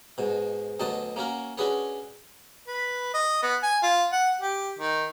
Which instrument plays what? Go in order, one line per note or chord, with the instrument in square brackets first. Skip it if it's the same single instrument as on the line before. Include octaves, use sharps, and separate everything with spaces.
[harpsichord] G#2 B2
D2 B2 F#3 D#5 F#5 A5
A#3 C#4 F#4 A#4
C#4 D4 F#4 G#4 B4 C#5
[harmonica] B4
D#5
B3
G#5
F4
F#5
G4
D#3